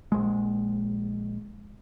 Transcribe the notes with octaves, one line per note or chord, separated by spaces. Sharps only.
A#1 G#3